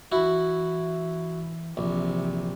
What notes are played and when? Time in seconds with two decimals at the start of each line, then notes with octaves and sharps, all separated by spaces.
0.12 E3 E4 F#4
1.77 A#1 C3 E3